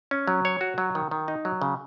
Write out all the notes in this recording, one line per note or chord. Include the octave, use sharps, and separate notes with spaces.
C#4
F#3
C#5
F#4
F#3
D#3
D#3
D#4
F#3
C#3